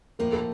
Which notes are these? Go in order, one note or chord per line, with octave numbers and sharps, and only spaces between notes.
A2 F3 A#3 A#4
A4